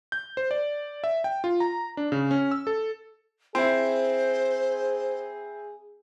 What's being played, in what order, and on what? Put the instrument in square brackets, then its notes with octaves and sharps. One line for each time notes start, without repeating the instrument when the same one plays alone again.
[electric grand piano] G6
C5
D5
E5
G5
F4
A#5
D4
C#3
C#4
E6
A4
[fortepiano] C4 E4 [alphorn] G#4 [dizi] C5